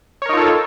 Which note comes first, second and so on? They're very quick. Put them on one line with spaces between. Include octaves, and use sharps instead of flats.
C#5 A#4 D#4 F4 A4